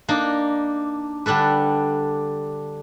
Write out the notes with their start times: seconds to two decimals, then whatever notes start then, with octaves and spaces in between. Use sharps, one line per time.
0.08 A#3 D4 D#4
1.26 D3 G3 D4 A4 B4